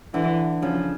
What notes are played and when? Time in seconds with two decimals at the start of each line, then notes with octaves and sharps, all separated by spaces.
0.14 D3 E3
0.62 C#3 F3